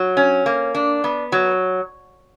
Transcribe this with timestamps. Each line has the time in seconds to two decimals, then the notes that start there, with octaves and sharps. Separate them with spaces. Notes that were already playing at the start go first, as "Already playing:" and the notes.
Already playing: F#3
0.17 C#4
0.46 A#3
0.75 D4
1.04 B3
1.32 F#3